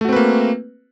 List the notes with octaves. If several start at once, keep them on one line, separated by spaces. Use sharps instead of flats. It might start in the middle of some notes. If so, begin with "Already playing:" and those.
A3 A#3 C4 F#4 B4